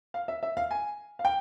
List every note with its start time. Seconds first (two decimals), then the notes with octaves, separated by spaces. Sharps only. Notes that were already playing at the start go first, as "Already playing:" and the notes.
0.14 F5
0.28 E5
0.43 E5
0.57 F5
0.71 G#5
1.19 F5
1.25 G5